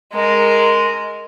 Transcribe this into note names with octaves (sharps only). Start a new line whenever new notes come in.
G#3 A#4